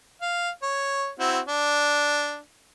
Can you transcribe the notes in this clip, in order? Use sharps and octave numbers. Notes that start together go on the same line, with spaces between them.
F5
C#5
C4 E4 F#4
D4